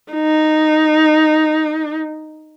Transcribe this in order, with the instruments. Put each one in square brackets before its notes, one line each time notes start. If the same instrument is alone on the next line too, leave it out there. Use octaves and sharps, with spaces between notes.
[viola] D#4